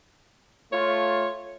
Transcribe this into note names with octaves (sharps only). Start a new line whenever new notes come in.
A3 F4 C#5